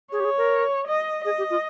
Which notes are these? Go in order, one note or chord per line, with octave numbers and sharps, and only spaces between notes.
G#4 C#5
G4
G#4
A#4
D#5
G#4 D#5
G4
F4